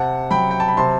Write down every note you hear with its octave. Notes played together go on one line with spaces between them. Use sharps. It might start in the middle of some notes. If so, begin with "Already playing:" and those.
Already playing: C3 F#5 A5
F#3 G5 B5
G5
A5
B5
C3 A5 C6